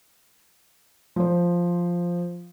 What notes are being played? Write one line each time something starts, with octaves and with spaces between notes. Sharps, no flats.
F3 C5